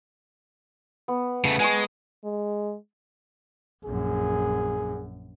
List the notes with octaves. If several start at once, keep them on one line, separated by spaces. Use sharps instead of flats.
B3
C#3 A3
G#3 G#5 A5 C#6
G#3
A#1 F#2 G#4